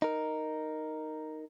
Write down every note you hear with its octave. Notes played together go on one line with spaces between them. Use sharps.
D#4 A#4